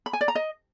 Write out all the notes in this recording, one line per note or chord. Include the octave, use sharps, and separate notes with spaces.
B5
G#5
D5
A#5
D#5